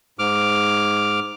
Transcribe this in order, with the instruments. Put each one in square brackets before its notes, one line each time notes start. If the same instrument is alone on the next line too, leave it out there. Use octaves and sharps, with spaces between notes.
[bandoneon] G#2 D6 F6